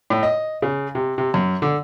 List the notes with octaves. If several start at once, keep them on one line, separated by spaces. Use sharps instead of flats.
A2
D#5
C#3
C3
C3
F#2
D3